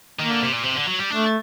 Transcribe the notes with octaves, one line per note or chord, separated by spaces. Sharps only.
D#3 A#3
D3
C3
A#2
C3
D3
F#3
G3
A3 D4